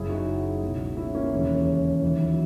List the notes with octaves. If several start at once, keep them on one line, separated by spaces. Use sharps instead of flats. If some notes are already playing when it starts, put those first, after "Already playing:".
Already playing: F#1 F#2 C#3 E4 G#4
D#4 F#4
C#2 B2
C#4 E4
A#3 C#4
E1 D#2 C#3 E3
D#2 D#3 E3
F#3